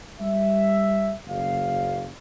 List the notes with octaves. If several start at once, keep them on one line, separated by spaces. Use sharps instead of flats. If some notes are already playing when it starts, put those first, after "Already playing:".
G3 E5
F#1 F5